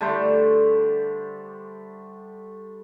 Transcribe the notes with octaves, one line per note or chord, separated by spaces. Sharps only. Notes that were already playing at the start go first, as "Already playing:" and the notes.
D3 G3 A3 C5